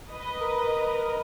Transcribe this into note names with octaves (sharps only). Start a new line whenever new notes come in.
B4 D#5
A#4